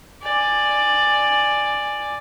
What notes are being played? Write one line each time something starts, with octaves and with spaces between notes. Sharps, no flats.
D5 G#5